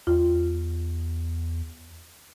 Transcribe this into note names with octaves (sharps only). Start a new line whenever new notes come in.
E2 F4